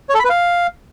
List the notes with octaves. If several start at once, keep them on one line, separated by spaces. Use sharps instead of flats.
C#5
A4
B5
B4
F5